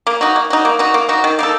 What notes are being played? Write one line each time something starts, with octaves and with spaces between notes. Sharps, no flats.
A#3
D#4 F#4
A#3
D#4 F#4
A#3
D#4 F#4
A#3
D#4 F#4
D#3
A#3 D#4 A4